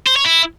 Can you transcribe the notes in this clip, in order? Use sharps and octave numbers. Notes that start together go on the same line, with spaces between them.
C5
C#5
E4